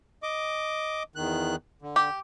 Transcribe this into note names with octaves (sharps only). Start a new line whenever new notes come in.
D#5 D6
E2 D#3 F#6
D3
G4